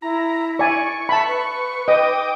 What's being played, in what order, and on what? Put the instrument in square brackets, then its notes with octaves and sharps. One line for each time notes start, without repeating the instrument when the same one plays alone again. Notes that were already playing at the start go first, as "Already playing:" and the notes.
[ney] E4 [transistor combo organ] A#5
[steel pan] D5 G#5 [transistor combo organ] C#6
[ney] E5 [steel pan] A5 B5
[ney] B4
[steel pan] D#5 [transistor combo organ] G5 D6 D#6